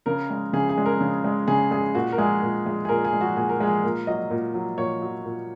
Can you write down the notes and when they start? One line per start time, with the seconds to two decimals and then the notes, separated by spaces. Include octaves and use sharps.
0.06 C#3 A#4
0.30 G#3
0.53 C#3 G#4
0.69 G#4
0.78 G#3
0.86 A#4
1.00 C#3
1.24 G#3
1.48 C#3 G#4
1.71 G#3 G#4
1.95 A#2 F#4
2.12 A#4
2.18 G#3 G#4
2.42 A#2
2.66 G#3
2.85 G#4
2.89 A#2 A#4
3.05 G#4
3.13 G#3
3.21 F#4
3.36 A#2 G#4
3.49 A#4
3.60 G#3 G#4
3.84 A#2 A#4
4.07 F#3 D#5
4.30 A#2
4.54 F#3
4.78 A#2 C#5
5.02 F#3
5.25 A#2